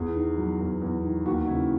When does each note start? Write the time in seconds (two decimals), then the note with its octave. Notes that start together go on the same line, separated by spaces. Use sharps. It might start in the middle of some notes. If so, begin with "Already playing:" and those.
Already playing: E2 G#4
0.16 D#3
0.38 F#3
0.60 E2
0.82 E2
1.04 D#3
1.26 D#2 F#4
1.47 C#3 E4